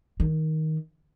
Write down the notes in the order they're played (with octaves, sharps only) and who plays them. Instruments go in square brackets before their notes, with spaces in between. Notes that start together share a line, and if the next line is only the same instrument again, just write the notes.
[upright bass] D#3